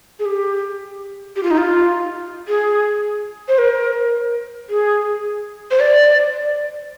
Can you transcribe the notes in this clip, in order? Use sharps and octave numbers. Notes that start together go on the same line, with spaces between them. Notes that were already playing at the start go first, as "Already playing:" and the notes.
G#4
G4
G4
F4
D#4
F4
G#4
C5
A#4
G#4
C5
D5